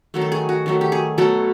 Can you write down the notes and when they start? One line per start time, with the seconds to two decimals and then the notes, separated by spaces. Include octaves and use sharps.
0.14 D#3 F#3 A3
0.22 A4
0.32 G#4
0.49 F#4
0.66 D#3 F#3 A3
0.81 G4
0.92 G#4
1.18 B2 F#3 A3 A4